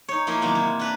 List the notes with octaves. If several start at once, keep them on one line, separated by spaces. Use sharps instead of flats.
D#4 C#5
F3 A#3 E4 F4
C3 D#3 E3 F#3 A#3 B3
E4
D4 B4 A#5